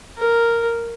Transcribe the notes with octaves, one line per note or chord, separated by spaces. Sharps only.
A#4